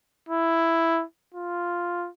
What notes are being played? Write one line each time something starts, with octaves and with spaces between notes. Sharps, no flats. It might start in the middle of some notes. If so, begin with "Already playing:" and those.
E4
F4